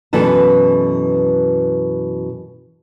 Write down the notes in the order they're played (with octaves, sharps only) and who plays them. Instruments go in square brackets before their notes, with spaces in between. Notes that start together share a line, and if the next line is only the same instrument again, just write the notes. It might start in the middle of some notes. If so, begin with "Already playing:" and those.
[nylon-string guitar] F#2 B2 E3 A4 B4 A5